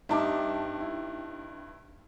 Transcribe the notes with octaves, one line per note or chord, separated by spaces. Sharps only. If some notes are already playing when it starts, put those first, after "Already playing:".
G2 C4 D#4 G4 E5 A5 D6
E4